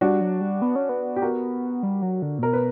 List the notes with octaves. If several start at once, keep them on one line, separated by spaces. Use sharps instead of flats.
G3 D4 F#4
F#3
G3
B3
C#4
B3
G4
F#4 A#4
G3
F#3
D3
A#2
B2 A#4
B4